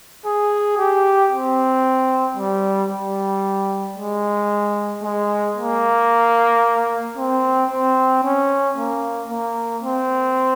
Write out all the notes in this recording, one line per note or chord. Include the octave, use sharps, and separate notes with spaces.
G#4
G4
C4
G3
G3
G#3
G#3
A#3
C4
C4
C#4
A#3
A#3
C4